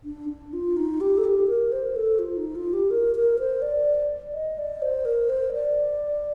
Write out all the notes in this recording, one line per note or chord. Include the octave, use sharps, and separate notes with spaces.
D4
D4
F4
D#4
G4
A4
G4
A#4
C5
A4
F4
D#4
F4
G4
A#4
A#4
C5
D5
D#5
D5
C5
A#4
C5
D5